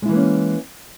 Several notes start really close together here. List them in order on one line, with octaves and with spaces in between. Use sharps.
G#3 E4 E3 A#3 C#4